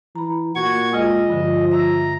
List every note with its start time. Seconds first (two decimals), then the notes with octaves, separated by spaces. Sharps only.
0.15 E3 A#5 B5
0.56 A#2 F#4 C#6 G#6
0.93 G#3 F4 G#4 D#5
1.30 G2 D3 F3
1.72 E5 A#5 E6